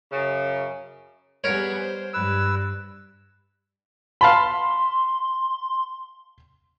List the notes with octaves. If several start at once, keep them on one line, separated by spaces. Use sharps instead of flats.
F#2 C#3
G3 B3 G#4 A#4 C#5
C5
G2 B4 E6
F5 A5 B5 C6